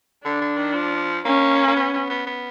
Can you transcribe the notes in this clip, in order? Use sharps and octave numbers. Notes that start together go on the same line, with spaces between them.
D3 D4
D3
D#3
F3
A#3 C#4
A#3
B3
B3
B3
B3